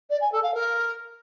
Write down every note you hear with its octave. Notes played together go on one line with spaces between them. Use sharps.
D5
G#5
A4
F5
A#4